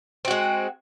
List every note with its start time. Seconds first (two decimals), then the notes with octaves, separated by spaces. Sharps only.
0.25 C4
0.28 F#4
0.31 G#3